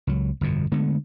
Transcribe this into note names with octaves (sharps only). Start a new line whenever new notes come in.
C#2 F#3
G1 F2 B2
D3 G#3 A3 B3